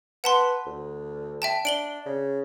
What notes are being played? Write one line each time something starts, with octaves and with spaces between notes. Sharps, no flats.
B4 F#5 A5 C6
D2
E5 G5 A5
D4 D7 F#7 G7
C#3